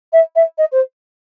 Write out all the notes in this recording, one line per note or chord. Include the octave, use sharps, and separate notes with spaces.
E5
E5
D#5
C5